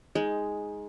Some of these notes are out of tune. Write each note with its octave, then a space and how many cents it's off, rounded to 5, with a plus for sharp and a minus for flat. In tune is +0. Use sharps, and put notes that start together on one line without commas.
G#3 +0 D#4 +15